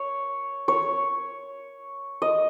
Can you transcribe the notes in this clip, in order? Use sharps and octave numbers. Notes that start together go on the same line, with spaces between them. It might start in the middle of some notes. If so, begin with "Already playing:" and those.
Already playing: C#5
C#5
D#5